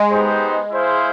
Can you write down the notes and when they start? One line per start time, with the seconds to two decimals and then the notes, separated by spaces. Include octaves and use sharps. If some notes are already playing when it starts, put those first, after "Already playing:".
Already playing: G#3
0.10 B3 D#4 G4 C5
0.71 E4 G#4 C5 F5